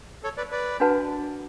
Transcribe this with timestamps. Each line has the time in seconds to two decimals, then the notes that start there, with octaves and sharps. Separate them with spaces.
0.24 A4 C#5
0.37 B4 D5
0.51 B4 D5
0.80 D4 F#4 B4 F#5 A5